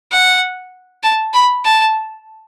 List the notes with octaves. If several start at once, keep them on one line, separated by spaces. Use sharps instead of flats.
F#5
A5
B5
A5